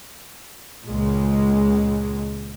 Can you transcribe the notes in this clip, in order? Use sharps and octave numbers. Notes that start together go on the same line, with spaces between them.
C#2 A#2 G#3